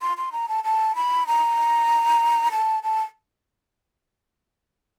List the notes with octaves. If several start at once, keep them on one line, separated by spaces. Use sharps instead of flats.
C6
C6
A#5
A5
A5
B5
A#5
A5
A5